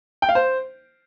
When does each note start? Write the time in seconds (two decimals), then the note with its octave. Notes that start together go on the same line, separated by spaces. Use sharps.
0.22 G5
0.29 F5
0.35 C5